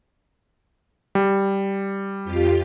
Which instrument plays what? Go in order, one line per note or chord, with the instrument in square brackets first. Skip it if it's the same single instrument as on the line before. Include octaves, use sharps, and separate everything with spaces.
[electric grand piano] G3
[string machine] F2 F4 G4